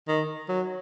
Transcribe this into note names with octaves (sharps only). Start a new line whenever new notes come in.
D#3
F#3